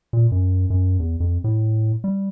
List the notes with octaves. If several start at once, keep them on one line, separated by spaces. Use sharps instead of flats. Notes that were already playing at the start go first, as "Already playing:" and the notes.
A#2
F#2
F#2
E2
F2
A2
G3